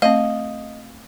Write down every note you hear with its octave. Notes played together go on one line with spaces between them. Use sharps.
A3 C4 D#5 F5